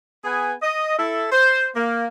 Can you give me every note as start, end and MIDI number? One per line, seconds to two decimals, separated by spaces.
0.24 0.52 59
0.24 0.52 68
0.24 0.52 71
0.24 0.52 80
0.62 0.97 75
0.98 1.27 64
0.98 1.27 69
1.32 1.66 72
1.75 2.06 58